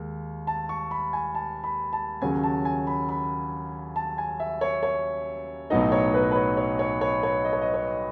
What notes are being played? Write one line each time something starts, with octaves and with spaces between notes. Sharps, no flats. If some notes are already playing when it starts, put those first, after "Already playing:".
Already playing: D#2 G#3
A5
C#6
B5
G#5
A5
B5
A5
D#2 C#3 F#3 C#4 G#5
A5
G#5
B5
B5
A5
G#5
E5
C#5
C#5
B1 A2 F#3 B3 D#4 D#5
C#5
B4
B4
C#5
C#5
C#5
C#5
C#5
D#5
C#5
D#5
C#5